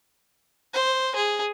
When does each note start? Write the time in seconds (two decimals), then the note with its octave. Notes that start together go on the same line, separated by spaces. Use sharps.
0.73 C5
1.15 G#4